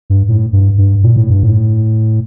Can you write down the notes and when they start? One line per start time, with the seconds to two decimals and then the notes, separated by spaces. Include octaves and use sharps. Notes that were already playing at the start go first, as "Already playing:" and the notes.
0.10 G2
0.29 A2
0.53 G2
0.78 G2
1.03 A#2
1.16 A2
1.30 G2
1.43 A2